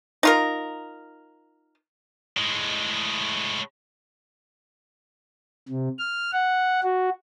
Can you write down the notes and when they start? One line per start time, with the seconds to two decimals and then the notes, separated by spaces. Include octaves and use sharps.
0.23 D#4 F4 A#4
2.37 A2 G#3
5.68 C3
5.99 F6
6.33 F#5
6.83 F#4